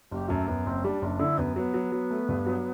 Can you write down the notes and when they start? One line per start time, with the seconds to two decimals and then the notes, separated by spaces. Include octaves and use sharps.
0.11 F#1 G4
0.29 F#2 A3
0.47 F#2 B3
0.65 F#1 C4
0.84 G3 D4
1.02 F#1 D4
1.19 D3 E4
1.38 F#2 B3
1.56 F#3 B3
1.74 F#3
1.92 F#3
2.10 A3
2.29 G2
2.46 F#3